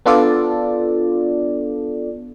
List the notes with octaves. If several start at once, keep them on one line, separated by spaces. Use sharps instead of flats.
B3 D4 F4 A4 D5